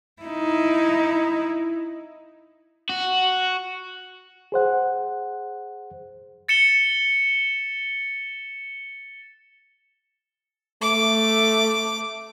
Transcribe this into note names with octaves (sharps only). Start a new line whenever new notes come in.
D#4 E4
F#4
G#4 C5 F#5
A6 C#7 E7 G7
A3 D6